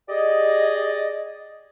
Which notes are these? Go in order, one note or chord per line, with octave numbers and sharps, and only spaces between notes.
G4 G#4 D5 D#5